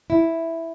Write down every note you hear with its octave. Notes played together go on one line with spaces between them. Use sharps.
E4